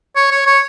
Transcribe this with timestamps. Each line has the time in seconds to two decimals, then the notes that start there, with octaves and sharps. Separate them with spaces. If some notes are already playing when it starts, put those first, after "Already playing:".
0.16 C#5
0.31 C#5
0.47 C#5